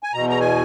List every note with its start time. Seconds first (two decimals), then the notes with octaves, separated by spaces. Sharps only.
0.03 G#5
0.13 E2 B2 A#5
0.30 A#5
0.40 G#5